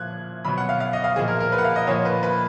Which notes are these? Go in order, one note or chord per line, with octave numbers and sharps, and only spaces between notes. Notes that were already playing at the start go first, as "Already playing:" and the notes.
Already playing: A#2 F3 F#6 G#6
B2 F#3 B5
F#5
F5
F5
D#5
F5
A#2 F3 G#4
A#4
A#4
B4
F#5
F5
D#5
A#2 F3 C#5
B4
B4